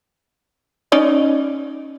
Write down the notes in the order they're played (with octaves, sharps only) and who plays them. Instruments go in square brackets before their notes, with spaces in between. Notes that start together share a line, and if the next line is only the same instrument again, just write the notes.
[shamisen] C#4 D#4 D5